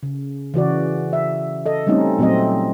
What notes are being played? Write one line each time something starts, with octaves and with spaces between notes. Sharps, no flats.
C#3
C#3 E3 F#4 D5
E5
A4 D#5
G3 A3 C4 C#4 D#4
A#2 F#3 A3 C4 D#5